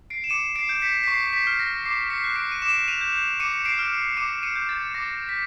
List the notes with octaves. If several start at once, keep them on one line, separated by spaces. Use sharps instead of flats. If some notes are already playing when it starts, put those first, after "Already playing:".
C7 D7
E7
D6 C#7 D#7
C7 D7
G6
B6 C#7
B6
C#6 C7
B6
F6
A#6
D6 C7
B6 C#7
F#6
C7 D7
D#7
D6 D7 E7
D#7 F7
G6
D6 C#7 D#7
C#7
C7 D7
F6
D6 C#7 D#7
C#7 D#7
G6
A6
D6 A#6
B6